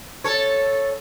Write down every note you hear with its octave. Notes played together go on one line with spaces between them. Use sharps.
A4 C#5